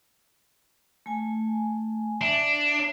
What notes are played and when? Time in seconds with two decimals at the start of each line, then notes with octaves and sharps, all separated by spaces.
1.06 A3 G#5
2.21 D4 E5